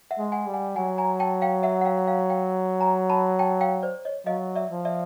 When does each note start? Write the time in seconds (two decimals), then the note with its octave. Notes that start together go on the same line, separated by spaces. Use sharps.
0.11 E5 F#5
0.18 G#3
0.32 F#5 G#5
0.46 G3
0.54 F#5 G#5
0.76 F#3 F#5 G#5
0.98 G#5 A#5
1.20 G5 A5
1.42 F5 G5
1.63 E5 F#5
1.81 F#5
1.85 F5 G5
2.07 F5 G5
2.30 F5 G5
2.80 G#5 A#5
3.10 A5 B5
3.39 G5 A5
3.61 F5 G5
3.83 C5 D5
4.05 C#5 D#5
4.26 F#3 D#5 F5
4.55 D5 E5
4.71 F3
4.85 D5 E5